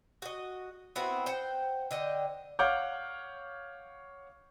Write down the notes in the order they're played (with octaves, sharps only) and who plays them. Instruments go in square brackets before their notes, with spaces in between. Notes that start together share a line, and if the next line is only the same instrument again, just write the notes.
[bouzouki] F#4 D#5
B3 C4 E4 F#4
C5 F#5 G5
D3 D#5 G5
[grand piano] C#5 F5 F#5 D6 F6 G6